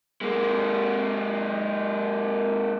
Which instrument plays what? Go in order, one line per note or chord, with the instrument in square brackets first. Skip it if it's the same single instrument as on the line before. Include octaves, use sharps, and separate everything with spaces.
[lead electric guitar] G#3 A#3